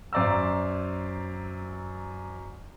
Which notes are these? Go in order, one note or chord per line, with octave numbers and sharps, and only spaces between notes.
F#2 C5 D5 A#5 E6